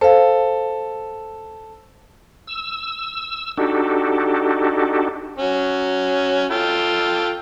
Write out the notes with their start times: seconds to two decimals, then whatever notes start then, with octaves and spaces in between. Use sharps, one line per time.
0.01 A4 C5 F5
2.47 E6
3.57 D4 D#4 F#4 G4 A4
5.38 C#4 F#4
6.51 F4 A4 G5